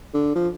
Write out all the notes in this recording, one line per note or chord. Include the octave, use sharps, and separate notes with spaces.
D3
F3